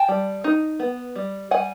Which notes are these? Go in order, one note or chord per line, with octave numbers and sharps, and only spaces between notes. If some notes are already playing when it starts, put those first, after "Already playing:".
Already playing: G5 A5
G3
D#4
B3
G3
G3 F#5 G#5